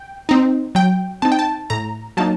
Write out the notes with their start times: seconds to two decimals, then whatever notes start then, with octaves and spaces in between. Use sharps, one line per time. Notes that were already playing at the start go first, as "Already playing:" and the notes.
Already playing: G5
0.29 C4 D#4
0.75 F#3 G5
1.22 C4 D#4 A5
1.32 G5
1.39 A5
1.70 A2 A#5
2.17 F#3 A#3 D#4 A5